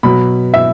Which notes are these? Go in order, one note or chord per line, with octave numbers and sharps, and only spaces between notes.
B2 F#3 B5
E5